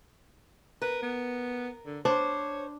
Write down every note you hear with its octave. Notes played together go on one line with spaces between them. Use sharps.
A#4 B4
B3
D3
D4 C5 C#5